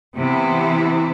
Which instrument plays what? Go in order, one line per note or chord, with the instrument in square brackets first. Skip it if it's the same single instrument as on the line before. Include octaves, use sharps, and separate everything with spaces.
[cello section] C3 E3 B3 E4